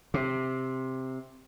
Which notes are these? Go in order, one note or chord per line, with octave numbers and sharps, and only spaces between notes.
C3